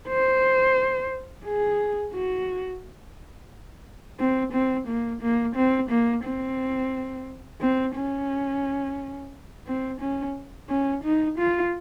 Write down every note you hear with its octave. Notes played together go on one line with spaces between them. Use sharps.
C5
G#4
F#4
C4
C4
A#3
A#3
C4
A#3
C4
C4
C#4
C4
C#4
C#4
D#4
F4